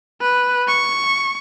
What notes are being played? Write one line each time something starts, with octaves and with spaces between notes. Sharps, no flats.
B4
C#6